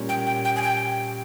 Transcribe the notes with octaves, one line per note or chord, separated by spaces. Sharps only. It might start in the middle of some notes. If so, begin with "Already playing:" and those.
Already playing: A#2 G3 C#4
G5
G5
G5
G#5
G5